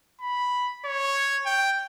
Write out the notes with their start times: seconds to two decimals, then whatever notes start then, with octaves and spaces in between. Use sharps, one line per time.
0.20 B5
0.85 C#5
1.46 G5